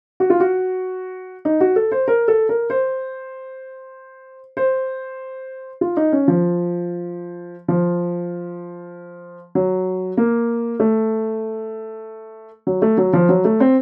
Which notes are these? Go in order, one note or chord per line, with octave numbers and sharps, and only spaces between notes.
F#4
F4
F#4
D#4
F#4
A4
C5
A#4
A4
A#4
C5
C5
F4
D#4
C#4
F3
F3
F#3
A#3
A3
F#3
A3
F#3
F3
F#3
A3
C4